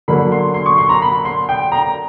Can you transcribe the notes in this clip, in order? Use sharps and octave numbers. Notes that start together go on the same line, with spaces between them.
D3 F#3 A#3 B5
C6
C6
C#6
C6
A#5
B5
C6
G5
A#5